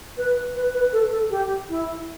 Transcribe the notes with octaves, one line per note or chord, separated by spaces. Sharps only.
B4
B4
B4
A4
A4
G4
E4